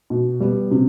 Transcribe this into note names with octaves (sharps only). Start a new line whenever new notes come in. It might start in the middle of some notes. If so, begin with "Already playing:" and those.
B2
G3 B3
C3